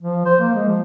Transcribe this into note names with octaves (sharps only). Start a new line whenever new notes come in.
F3
C5
A#3
G#3
F3